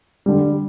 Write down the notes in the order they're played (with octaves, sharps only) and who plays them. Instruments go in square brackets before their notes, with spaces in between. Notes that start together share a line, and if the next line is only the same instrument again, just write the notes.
[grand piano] D3 G3